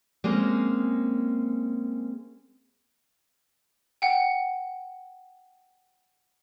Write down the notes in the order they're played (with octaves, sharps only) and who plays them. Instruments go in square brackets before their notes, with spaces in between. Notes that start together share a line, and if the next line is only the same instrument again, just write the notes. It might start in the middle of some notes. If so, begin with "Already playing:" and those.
[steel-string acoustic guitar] G#3 A#3 C4 C#4
[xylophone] F#5 G5